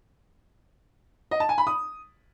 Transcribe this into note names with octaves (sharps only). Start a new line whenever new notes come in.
D#5
A5
G#5
B5
D#6